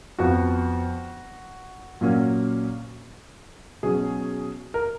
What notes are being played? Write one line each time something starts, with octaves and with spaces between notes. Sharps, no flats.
F2 F3 B3 F#4
A#2 F#3 A#3 C#4
B2 F#3 C#4 G#4
A#4